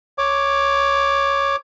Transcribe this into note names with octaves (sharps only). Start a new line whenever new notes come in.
C#5 D6